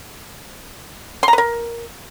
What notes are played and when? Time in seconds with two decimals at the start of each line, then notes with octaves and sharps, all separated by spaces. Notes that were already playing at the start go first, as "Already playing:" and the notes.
1.23 C6
1.28 A#5
1.33 B4
1.38 A#4